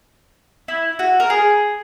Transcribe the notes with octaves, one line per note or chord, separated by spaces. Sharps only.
E4
F#4
A#4
G#4